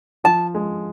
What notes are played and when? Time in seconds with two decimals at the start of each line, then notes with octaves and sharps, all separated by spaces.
0.24 F3 A5
0.54 G#3